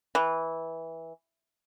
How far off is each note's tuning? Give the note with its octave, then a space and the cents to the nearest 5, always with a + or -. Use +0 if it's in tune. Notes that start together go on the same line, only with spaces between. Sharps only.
E3 -10